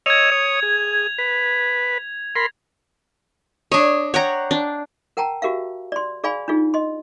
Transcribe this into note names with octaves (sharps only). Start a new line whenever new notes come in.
C#5 D#5 E6 G#6 F7
C#5 D#6
G#4
B4
A#4 B5 C6
D4 C#5 D#5
C#5 F#5 G5 A#5
D4
A#4 F#5 G5 A5 A#5
F#4 G4 A#4 E5 F5
D5 C6
G#4 D5 F5 G#5 B5
D4 D#4 F4 G#4
D#5 C6